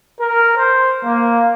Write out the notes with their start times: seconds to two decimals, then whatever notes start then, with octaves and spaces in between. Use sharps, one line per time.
0.20 A#4
0.58 C5
1.04 A#3